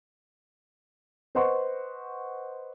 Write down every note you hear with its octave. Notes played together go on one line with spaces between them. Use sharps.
B4 C5 D#5 F#5 C6 C#6